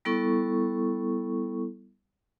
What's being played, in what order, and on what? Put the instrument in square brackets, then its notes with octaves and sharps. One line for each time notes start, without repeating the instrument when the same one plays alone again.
[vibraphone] G3 B3 E4 A4 C#6